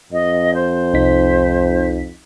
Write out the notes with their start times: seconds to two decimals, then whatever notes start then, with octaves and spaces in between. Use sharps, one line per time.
0.12 F2 D#5
0.54 C5
0.94 C2 D#4 B6